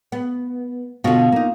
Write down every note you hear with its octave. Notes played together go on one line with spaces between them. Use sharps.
B3
B2 D3 F4 F#4
A#3 D#4